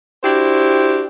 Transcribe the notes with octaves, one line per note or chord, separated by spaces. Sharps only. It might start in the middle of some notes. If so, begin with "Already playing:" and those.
D4 E4 F#4 G4 C5